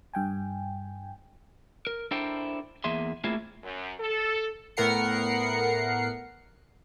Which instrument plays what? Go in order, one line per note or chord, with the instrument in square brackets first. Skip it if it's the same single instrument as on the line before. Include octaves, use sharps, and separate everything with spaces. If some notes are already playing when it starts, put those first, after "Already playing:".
[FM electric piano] G2 G5 G#5
[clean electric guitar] A#4
D4 E4 A4 A#4 C5 G5
E2 A#3 G#4 E5 C6
A3 A#3 C4 E4 F4 G#4
[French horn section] F#2
A4
[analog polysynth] A2 B3 A#4 F#5 C7 C#7